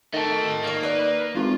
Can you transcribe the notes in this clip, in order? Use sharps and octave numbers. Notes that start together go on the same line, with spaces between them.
D#3 A3 D#5 A5
A#3 F4 C#5
D#4 B4 D5
G#1 F4